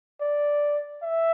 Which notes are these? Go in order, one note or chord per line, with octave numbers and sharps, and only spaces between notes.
D5
E5